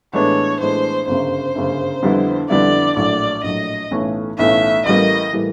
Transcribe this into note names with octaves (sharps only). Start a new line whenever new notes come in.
A2 E3 G#3 B3 D4 C#5
A2 E3 G#3 B3 D4 C5
G1 F#2 C#3 C5
G1 F#2 C#3
F2 D3 G3 B3 E4
F2 D3 G3 B3 E4 D5
A#1 A2 F#3 D5
A#1 A2 F#3 D#5
B1 A2 E3 A3 C#4
B1 A2 E3 A3 C#4 E5
A1 A2 E3 G3 A#3 D#5
A2 E3 G3 A#3